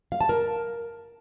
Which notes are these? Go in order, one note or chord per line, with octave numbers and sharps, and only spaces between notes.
F5
A5
A#4